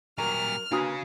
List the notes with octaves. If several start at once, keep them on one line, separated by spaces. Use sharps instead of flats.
A#2 F#3 G3 A#4 F6
C#3 A#3 D4 F#4 B4 G#5 D#6